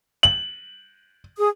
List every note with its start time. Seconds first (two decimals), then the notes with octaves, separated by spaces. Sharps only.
0.23 F#7
1.37 G#4 D#6